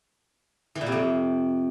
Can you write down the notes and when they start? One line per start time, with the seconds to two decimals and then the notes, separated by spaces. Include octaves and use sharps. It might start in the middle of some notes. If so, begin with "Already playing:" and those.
0.75 E3
0.81 A#2
0.86 C3
0.92 F2